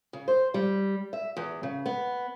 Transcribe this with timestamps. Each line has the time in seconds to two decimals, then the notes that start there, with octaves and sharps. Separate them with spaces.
0.13 C#3
0.28 C5
0.54 G3
1.13 E5
1.37 E2
1.63 C#3
1.86 B3